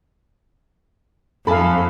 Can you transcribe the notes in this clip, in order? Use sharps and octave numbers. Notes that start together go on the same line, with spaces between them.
F2 A4 F5 G#5 A5 B5